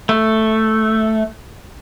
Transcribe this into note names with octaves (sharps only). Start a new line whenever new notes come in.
A3